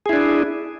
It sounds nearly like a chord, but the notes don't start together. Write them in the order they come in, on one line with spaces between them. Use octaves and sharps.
G#4 E4 D4